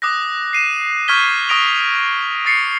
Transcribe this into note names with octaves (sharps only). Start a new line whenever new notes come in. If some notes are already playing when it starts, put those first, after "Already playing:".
D6 D#6 F#6 A#6
C7 D#7 E7
C#6 F6 G6 G#6 B6 G7
C#6 D#6 A#6 D7 F7
D#6 A6 C7 C#7